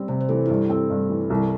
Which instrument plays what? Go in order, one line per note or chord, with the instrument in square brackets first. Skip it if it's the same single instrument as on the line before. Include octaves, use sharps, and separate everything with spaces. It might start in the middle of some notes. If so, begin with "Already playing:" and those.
Already playing: [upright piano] G3 C4
[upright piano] C3 [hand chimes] C5
[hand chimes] C5
[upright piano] E3 [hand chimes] A4
[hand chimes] E4
[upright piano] G2 [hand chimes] G4
[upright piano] C4 [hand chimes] A4
[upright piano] G2
E3
C2